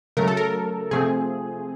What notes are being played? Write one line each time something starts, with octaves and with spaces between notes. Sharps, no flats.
C#3 F#3 A3 A#4
A4
A#4
C3 F3 A3 C4 G#4